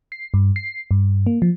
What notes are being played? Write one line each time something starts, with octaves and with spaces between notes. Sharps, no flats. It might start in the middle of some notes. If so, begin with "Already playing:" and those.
C7
G2
C7
G2
A#3
F3